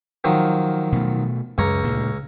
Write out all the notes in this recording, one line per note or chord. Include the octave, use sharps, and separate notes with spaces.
D#3 F3 F#3
B2 A3
C#2 F#2 C#5 A#5
D2 A#2 G#3